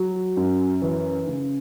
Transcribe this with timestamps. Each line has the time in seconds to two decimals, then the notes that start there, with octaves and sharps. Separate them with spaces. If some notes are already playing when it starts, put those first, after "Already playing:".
Already playing: F#3
0.37 F#2
0.82 E3
1.27 C#3